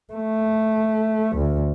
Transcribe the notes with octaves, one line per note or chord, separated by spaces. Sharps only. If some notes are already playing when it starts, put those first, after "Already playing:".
A3
D2